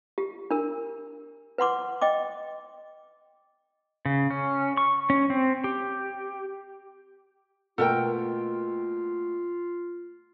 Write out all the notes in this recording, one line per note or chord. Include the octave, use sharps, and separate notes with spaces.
G4
D4 A#4
B4 F#5 C6 D6
D#5 G5 D6
C#3
C#4
C#6
C#4
C4
G4
B2 A3 A#3 F4 A4 A#4 G5